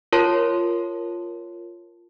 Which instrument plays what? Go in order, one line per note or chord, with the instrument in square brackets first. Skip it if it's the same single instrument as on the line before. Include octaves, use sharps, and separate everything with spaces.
[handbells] F4 A#4 C#5 A5 C6